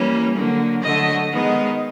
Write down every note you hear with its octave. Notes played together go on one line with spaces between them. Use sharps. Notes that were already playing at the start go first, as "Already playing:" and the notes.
Already playing: E3 G3 A#3 C#4
D3 F#3 A#3
D3 F#3 A3 D#5
D#3 G#3 B3 D#4